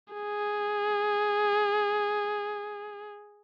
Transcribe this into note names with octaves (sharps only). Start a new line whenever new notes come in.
G#4